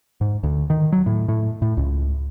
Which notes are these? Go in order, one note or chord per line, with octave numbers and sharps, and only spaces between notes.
G#2
D2
D#3
F#3
A2
A2
A2
C#2